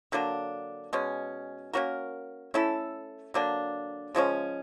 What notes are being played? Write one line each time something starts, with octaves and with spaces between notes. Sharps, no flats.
D3 F#3 A#3 D4
B2 G#3 C#4
A#3 C#4 F#4 A#4
A3 C#4 E4 A4
D3 F#3 A#3 D4
C#3 F3 G#3 C#4